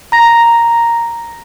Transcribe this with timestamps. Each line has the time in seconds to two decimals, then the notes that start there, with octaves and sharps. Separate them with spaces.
0.12 A#5 A#6